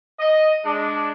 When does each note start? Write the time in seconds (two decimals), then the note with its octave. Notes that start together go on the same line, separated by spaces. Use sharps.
0.19 D#5
0.65 G#3 D4